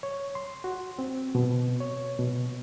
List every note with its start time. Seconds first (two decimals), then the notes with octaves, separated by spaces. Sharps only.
0.03 C#5
0.35 C6
0.64 F#4
0.99 C4
1.35 B2
1.80 C#5
2.19 B2